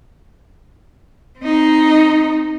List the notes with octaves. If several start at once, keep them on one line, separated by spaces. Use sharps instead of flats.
C4 D#4